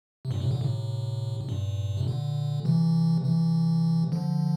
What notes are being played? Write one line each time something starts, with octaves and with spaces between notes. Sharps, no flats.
C3
G2 A#2
A2 C3
A#2 D3
A2 C3
C3
G2 A#2
C3
A#2 D3
C3 E3
C3 E3
D3 F3